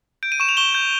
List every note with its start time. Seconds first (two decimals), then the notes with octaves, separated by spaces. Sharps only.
0.23 G6 D7
0.32 D#7
0.40 C#6 E7
0.49 F7
0.57 C#6 G7
0.75 G6